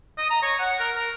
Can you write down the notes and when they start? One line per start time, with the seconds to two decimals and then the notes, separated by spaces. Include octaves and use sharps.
0.18 D#5
0.30 A#5
0.43 C#5
0.60 F#5
0.80 A#4
0.96 A#4